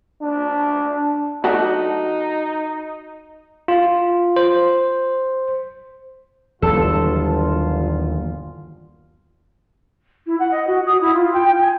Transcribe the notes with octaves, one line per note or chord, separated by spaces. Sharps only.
D4
F#3 A3 D4 D#4 F#4
F4
C5
G1 D#2 A#2 E3 F#3 F4 A4
E4
F#5
D#5
F#4
D#6
E4
F4
G5
G5
G#5